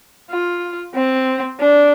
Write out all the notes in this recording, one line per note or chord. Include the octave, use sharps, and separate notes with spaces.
F4
C4
D4